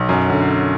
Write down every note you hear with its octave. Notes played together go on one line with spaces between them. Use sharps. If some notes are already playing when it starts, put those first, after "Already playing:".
Already playing: B1
F#2
D3